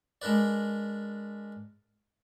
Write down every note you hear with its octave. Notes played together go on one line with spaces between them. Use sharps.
G#3 D4 A#4 B4 D5